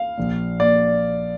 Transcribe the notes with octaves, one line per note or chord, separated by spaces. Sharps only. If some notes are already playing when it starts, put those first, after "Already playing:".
Already playing: F5
A#1 A#2
A#2 D5